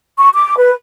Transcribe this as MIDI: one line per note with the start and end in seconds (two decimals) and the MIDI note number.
0.19 0.30 85
0.34 0.57 86
0.58 0.72 71